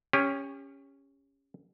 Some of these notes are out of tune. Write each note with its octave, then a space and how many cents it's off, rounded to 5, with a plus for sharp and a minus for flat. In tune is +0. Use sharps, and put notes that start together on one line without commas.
C#4 +0 G4 +35